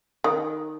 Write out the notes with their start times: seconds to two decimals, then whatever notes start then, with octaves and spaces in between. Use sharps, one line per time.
0.24 D#3